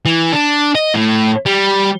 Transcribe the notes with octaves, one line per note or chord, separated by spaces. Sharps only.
E3
D4
D#5
A2
G3